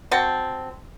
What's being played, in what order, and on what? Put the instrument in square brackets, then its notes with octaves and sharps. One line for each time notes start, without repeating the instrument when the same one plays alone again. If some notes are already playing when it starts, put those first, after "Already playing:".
[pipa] C4 F#4 A5